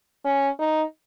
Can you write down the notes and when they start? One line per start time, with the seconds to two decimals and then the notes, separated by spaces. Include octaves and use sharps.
0.25 C#4
0.59 D#4